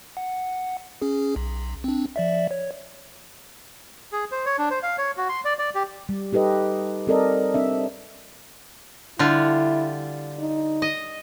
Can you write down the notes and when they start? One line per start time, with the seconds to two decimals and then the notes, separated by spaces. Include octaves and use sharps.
0.17 F#5
1.02 C#4 G#4
1.36 B1
1.84 C4 D4
2.16 F3 D5 E5
2.51 C#5
4.12 G#4
4.32 C5
4.45 C#5
4.58 D4
4.70 C5
4.83 F5
4.98 C#5
5.17 F#4
5.29 C6
5.45 D5
5.59 D5
5.75 G4
6.09 G3
6.33 D#4 G4 A4 B4 D#5
7.07 G3 C4 A4 A#4 D5 D#5
7.54 C4 D4 E5
9.19 D3 G3 E4 F4
10.39 D#4
10.82 D#5